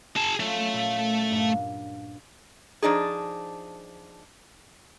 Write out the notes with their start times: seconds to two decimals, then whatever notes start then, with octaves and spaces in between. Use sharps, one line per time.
0.16 G#4 A5
0.40 F#3 A3 C#4 F4
0.73 A#2
1.30 G2 A#2 D4
2.82 F3 D4 D#4 G#4